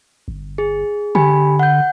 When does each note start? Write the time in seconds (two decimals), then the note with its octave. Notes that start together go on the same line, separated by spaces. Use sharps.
0.28 G1
0.58 G#4
1.15 D3 G4 G#5 B5
1.59 F#5 G6